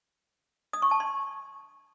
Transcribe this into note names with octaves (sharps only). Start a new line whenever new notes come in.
D#6
C#6
A5
C6